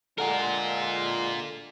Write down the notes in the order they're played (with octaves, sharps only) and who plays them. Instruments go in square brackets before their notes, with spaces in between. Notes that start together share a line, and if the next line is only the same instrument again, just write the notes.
[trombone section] D3 G#3 [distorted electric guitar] F4 A#4 [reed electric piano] A4 F#5 G#5